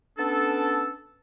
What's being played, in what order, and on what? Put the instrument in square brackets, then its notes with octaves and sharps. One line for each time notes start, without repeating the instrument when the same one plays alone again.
[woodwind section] B3 C#4 D4 A4